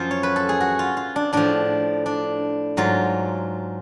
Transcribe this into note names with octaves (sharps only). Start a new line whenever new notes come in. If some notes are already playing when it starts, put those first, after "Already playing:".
Already playing: F#2 F3 F4
C#5
B4
A4
G#4
F#4
F4
F4
D4
A2 F3 D4
D4
G#2 F#3 F4